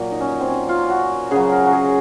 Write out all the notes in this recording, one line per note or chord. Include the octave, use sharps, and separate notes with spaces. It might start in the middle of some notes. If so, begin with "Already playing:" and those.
Already playing: A#2 F#3
D#4
C#4
C4
C#4
F4
F#4
C#3 F#3 G#4
A#4
F#4
G#4